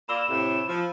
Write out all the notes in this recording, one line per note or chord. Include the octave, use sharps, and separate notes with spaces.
A#3 F4 D5 B5 E6 E7 G7
A2 C3
F3